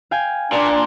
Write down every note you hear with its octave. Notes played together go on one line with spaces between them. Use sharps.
F5 G5 G#5
A#2 D4